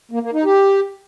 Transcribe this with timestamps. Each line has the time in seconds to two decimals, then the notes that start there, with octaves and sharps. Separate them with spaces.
0.11 A#3
0.22 A#3
0.33 D#4
0.44 G4